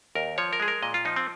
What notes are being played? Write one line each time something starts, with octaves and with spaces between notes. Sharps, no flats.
D#2 A#4
F3 C#5
A#4
G#3 G#4
A#4
A#2 D#5
F4
F3 D#4
C4